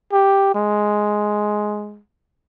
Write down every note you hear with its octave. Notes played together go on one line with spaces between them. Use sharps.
G4
G#3